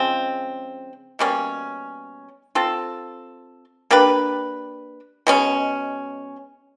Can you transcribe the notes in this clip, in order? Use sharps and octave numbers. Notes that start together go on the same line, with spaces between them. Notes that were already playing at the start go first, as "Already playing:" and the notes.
Already playing: C#3 F3 G#3 C4
B2 G3 A#3 C#4
C4 F4 A4
A#3 D4 G4 B4
B2 G#3 C#4